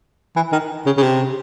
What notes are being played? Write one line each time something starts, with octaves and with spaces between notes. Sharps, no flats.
E3
D#3
C#3
C#3
C3